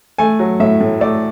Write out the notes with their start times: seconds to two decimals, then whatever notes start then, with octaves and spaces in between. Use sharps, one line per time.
0.18 A3 G#5
0.39 F#3
0.60 A2 E5
0.81 A2
1.01 A3 D5